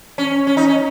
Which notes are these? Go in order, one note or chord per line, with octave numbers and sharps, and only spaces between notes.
C#4
C#4
D#4
C#4